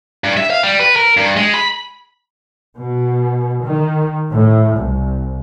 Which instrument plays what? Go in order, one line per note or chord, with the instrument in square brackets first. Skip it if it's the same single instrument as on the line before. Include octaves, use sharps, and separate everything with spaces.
[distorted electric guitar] G2
E5
F5
G3
B4
A#4
G2
G#3
B5
[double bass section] B2
D#3
A2
C2